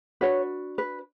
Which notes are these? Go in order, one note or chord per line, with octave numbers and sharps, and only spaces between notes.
D4 F#4 B4 C#5
B4